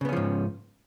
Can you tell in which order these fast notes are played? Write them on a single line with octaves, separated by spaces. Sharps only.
C#3 B3 C#4 F3 G#2